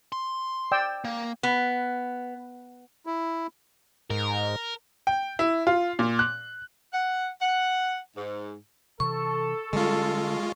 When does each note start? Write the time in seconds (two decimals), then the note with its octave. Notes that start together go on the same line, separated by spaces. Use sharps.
0.12 C6
0.72 D5 G5 E6
1.05 A#3
1.43 B3
3.06 E4
4.10 G#2 A#4
5.07 G5
5.39 E4
5.67 F4
5.99 A#2
6.19 F#6
6.93 F#5
7.41 F#5
8.17 G#2
9.00 C3 E3 A4 C#6
9.73 D3 G3 G#3 C#4 F4